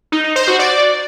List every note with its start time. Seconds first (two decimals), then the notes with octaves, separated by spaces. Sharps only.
0.12 D#4
0.24 D#4
0.36 C5
0.48 F#4
0.59 D5